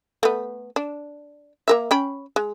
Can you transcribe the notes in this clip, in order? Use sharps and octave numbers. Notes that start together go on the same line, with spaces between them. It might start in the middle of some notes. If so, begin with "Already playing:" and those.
A3 B3
D4
A#3 A#4 E5
C#4 G5 B5
G#3